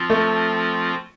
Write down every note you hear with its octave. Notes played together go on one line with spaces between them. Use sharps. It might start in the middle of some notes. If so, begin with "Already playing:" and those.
Already playing: F3 C4 F4
A3